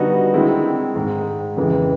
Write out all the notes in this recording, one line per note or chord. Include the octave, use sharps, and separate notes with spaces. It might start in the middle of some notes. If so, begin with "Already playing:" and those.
Already playing: D3 G3 B3 D#4 F#4
D#3 G#3 C4 E4
G#2 D#3 G#3
F2 C#3 E3 G#3